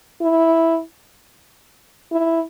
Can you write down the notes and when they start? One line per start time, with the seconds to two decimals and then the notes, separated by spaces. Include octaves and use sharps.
0.22 E4
2.12 E4